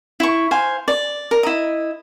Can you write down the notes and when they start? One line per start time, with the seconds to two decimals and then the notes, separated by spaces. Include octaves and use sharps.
0.20 E4 C#6
0.51 C5 F5 G#5
0.88 D5
1.31 A#4
1.43 E4 D#5